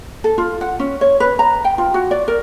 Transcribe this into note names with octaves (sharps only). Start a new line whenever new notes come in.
A4
F4
F#5
C#4
C#5
B4
A#5
G5
F4
F#4
D5
A#4